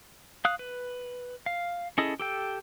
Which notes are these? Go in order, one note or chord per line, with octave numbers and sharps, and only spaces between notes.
F5 D#6 F#6
B4
F5
C#4 E4 G#4 A4 D#5
G4 A4 G5